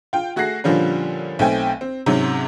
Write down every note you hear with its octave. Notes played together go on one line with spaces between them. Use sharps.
F4 G5
A3 F#4 G#4 F#6 A#6 C7
A#2 D3 F3 G3 C#4
B1 A3 C4 G5 G#5
C4
G#2 C3 F#3 C#4